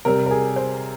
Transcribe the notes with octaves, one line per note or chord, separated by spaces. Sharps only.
C3 G3 A#4
A#4
G#4
C5